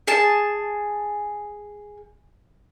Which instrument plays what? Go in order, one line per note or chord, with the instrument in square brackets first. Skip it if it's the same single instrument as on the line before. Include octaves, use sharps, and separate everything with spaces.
[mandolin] G#4 A5